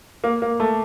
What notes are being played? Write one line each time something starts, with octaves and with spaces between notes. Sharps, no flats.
A#3
A#3
A3